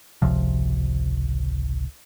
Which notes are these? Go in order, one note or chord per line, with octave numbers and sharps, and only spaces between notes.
G#1 C#2 C3 F3